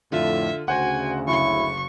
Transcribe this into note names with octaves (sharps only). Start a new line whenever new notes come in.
F2 A2 D3 F4 E5
D2 C#3 F#4 C5 F#5 G#5
F#1 E4 C#6